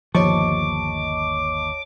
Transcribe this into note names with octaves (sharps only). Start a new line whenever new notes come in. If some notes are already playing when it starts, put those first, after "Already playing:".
G1 D#2 F3 C#5 D#5 A5 C#6 D6